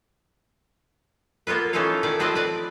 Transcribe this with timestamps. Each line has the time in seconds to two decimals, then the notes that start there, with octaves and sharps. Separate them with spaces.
1.47 A#3 B3 F4 B4
1.73 E3 C#4 D#4 F4 A4 F5
2.03 D#3 A3 G#4 D5
2.19 F3 C4 B4 C5 D5 D#5
2.35 B4 D5